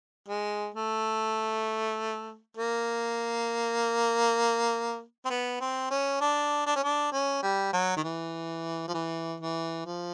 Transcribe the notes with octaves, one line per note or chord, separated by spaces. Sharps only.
G#3
A3
A#3
C4
B3
C4
C#4
D4
D4
C#4
D4
C#4
G3
F#3
D#3
E3
F3
E3
E3
F3